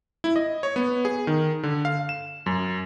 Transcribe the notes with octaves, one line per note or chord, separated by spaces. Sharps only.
E4
D#5
C#5
B3
G#4
D#3
D3
F5
E7
F#2